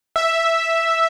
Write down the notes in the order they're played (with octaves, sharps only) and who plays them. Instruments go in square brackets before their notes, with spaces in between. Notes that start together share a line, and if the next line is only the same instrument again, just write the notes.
[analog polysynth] E5